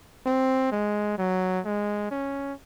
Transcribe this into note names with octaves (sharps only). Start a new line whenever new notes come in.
C4
G#3
F#3
G#3
C#4